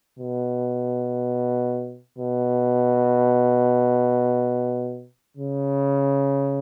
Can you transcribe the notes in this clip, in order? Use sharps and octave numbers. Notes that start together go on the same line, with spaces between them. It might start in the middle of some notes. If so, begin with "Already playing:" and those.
B2
B2
C#3